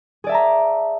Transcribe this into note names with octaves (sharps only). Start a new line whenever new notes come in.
G#4 D5 E5 A5 A#5